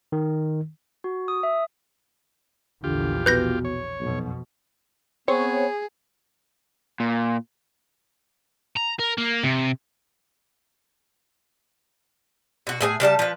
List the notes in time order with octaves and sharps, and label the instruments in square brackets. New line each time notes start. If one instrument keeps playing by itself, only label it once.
[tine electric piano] D#3
[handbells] F#4
D#6
E5
[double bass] A#1 E2 [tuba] D3 [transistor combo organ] F4 G4
[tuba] B2 [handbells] B4 G6 A#6
[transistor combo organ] C#5
[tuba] B1 [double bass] F2 B2
[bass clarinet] B3 [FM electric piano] C4 [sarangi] G#4 [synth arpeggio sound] C#5
[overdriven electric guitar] A#2
[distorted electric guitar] A#5
A#4
A#3
C3
[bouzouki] B2 F#4
A2 G#4 G#5
C#3 G3 A4 A5
F3 B4